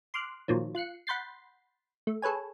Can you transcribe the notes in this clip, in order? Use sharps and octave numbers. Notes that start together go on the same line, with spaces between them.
C6 D6 F6 F#6
A#2 D#3 F3 F#3
F4 F#6 C7 C#7
F#5 B5 C6 G6 A6 C7
A3
G#4 A4 B4 C#5 G#5